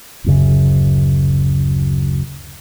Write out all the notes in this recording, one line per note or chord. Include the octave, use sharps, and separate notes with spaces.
D1 F#2 C#3